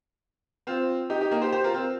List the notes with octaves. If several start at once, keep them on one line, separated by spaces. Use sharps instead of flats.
C4 F4
D#4 G4
D#4 G4
A#3 D#4
G4 C5
G4 C5
F4 A#4
C4 F4